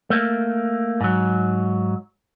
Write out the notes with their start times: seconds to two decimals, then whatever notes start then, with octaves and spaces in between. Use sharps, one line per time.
0.10 A3 A#3
1.01 G#2 F#3